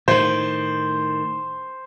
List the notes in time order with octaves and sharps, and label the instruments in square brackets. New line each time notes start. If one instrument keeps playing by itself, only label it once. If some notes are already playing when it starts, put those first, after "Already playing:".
[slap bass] A2 D#3 [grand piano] C5